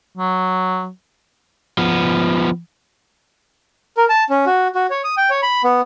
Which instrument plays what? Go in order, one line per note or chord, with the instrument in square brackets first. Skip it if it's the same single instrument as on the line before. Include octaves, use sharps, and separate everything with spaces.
[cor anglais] F#3
[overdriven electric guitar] F3 B3
[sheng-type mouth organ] A#4
A5
C#4
F#4
F#4
C#5
D#6
G5
C#5
B5
B3